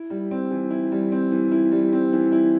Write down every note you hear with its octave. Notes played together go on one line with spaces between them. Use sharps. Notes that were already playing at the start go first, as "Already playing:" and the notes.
Already playing: E4
G3
C4
E3
E4
G3
C4
E3
E4
G3
C4
E3
E4